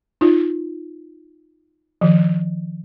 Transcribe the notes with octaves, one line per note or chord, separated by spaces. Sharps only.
D#4 F4
D#3 F3